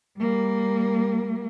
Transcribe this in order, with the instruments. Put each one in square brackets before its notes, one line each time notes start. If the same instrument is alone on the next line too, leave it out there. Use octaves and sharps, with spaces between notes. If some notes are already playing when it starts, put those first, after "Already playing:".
[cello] G3 A#3